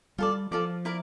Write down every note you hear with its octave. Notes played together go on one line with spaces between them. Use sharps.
G3 F4 A4 D5
F3 F4 A4 D5
E4 A#4 D5